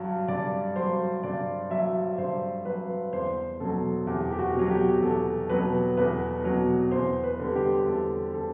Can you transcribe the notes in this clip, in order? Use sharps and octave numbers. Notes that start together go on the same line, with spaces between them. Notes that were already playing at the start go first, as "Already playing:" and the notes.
Already playing: G2 F#3
G2 D5
F#3 C5
G2 D5
F#3 E5
G2 C5
F#3 B4
E2 C5
B2 F#3 A4
E2 G4
G4
F#4
B2 F#3
G4
E2 A4
B2 F#3 B4
E2 B4
B2 F#3
E2 C5
B4
D3 G3
G4
E2 A4
D3 A4